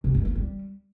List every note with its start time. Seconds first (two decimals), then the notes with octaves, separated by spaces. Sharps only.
0.04 C3
0.14 G2
0.25 A#3
0.35 G3